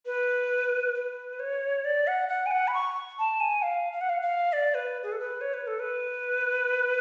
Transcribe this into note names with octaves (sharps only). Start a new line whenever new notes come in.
B4
B4
C#5
D5
F#5
F#5
G#5
F#5
B5
C#6
A5
G#5
F5
F5
F#5
F5
F5
D5
B4
G#4
A4
B4
C#5
B4
A4
B4